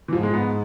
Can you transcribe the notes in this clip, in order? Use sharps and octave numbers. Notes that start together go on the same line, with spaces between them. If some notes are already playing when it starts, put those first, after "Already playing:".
E3
G#2 F3
G#3
B3